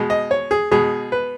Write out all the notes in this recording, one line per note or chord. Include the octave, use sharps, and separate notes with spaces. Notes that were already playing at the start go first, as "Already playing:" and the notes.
Already playing: B2 G#3
D#5
C#5
G#4
B2 G#3 G#4
B4